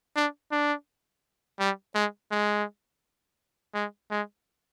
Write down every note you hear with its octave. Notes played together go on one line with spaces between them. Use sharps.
D4
D4
G3
G#3
G#3
G#3
G#3